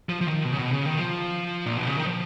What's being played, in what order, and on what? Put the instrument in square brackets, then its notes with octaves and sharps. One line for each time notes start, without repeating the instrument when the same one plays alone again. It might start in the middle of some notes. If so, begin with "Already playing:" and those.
[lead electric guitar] F3
F3
D#3
B2
C#3
B2
C#3
D#3
F3
A#2
B2
C#3
D#3
F3